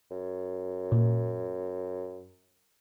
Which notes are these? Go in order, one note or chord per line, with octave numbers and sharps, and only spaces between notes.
F#2
A#2